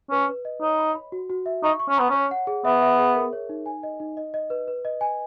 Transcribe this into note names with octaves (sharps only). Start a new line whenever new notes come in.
C#4 B4
B4
D#5
D#4 C#5
B5
B5
F#4
F#4
E5
D#4 C#6
C#6
C#4
B3 A#5
C#4 C#5
F#5
G#4
B3 E5
E5
G#4
A#4
C#5
D#4
G#5
D#5
D#4
D#5
D#5
B4
B4
D#5
G#5